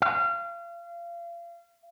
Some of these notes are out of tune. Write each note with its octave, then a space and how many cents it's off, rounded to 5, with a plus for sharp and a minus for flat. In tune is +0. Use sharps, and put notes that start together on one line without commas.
F5 -30